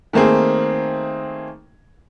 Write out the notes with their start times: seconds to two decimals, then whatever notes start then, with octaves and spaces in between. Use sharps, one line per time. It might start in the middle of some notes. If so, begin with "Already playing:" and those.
0.13 D#3 A3 A#3 C4 G#4